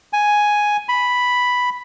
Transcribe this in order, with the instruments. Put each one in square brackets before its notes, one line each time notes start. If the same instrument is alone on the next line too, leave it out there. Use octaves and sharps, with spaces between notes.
[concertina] G#5
B5